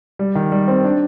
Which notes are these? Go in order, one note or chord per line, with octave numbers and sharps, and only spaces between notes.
G3
D#3
G3
C4
D4